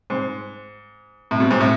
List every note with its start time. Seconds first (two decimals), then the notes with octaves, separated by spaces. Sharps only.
0.10 G#2
1.31 A2
1.40 B2
1.51 G#2
1.60 A2